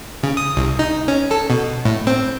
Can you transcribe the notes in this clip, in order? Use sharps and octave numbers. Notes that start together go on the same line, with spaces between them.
C#3
D#6
C2
D#4
C#4
A4
B2
A2
C4